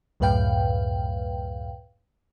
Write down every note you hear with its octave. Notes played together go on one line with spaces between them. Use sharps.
C#2 F#2 A2 B4 F5 G5